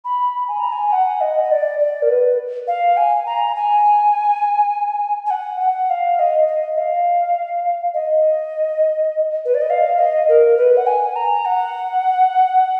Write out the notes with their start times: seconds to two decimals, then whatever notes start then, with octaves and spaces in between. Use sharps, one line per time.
0.05 B5
0.48 G#5
0.60 A#5
0.72 G#5
0.93 F#5
1.21 D#5
1.44 D#5
1.51 D5
1.79 D5
2.02 A#4
2.09 B4
2.68 F5
2.97 G#5
3.26 A#5
3.56 G#5
5.26 G#5
5.31 F#5
5.60 F#5
5.90 F5
6.19 D#5
6.48 D#5
6.78 F5
7.94 D#5
9.45 B4
9.54 D5
9.61 D#5
9.70 F5
9.99 D#5
10.29 A#4
10.57 B4
10.77 F#5
10.87 G#5
11.16 A#5
11.45 F#5